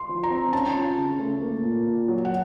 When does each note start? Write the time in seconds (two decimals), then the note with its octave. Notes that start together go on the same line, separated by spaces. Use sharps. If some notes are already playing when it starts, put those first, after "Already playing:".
Already playing: C6
0.09 F3
0.23 A#5
0.30 C4
0.52 C#4 A5
0.75 F4
0.97 C#3
1.19 A3
1.42 A#3
1.64 A#2
1.86 A#2
2.08 F#3
2.25 F#5